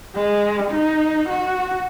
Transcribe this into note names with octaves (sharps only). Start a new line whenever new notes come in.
G#3
D#4
F#4